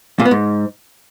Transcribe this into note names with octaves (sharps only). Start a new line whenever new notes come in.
A#2
B3
G#2